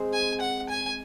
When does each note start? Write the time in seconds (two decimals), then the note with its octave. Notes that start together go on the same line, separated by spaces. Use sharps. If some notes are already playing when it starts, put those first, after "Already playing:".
Already playing: G#3 C4
0.13 G#5
0.40 F#5
0.69 G#5